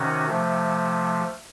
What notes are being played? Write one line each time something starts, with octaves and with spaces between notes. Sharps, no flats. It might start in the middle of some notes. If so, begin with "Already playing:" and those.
Already playing: C3 D#3 C#4 F#4
C3 F3 A3